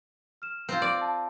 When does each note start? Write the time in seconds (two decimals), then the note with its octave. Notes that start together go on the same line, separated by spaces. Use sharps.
0.42 F6 E7
0.69 C4 F4
0.82 D5
1.01 A5